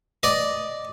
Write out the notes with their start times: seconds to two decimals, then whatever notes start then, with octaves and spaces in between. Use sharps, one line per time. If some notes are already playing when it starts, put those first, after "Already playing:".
0.23 D5 D#5